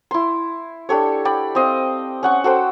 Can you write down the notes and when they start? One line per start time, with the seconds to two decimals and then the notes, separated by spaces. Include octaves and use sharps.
0.11 E4 C6
0.89 D4 G4 A4 C#5
1.25 D5 G5 B5
1.55 C4 D#5 F5
2.23 C#4 F#5 C#6
2.44 F#4 A4 C5 G5